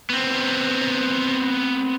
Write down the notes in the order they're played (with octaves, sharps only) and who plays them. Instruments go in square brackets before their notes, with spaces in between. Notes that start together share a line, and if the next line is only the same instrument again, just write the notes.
[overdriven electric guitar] B3 C4